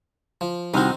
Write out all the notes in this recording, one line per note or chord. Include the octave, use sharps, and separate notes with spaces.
F3
C2 D#3 C4 D#4 F#4